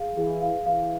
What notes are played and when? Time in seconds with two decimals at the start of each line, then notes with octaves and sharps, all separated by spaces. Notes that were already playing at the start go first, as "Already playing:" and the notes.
Already playing: G#4 F5
0.17 E3 G#4
0.42 F5
0.66 E3 F5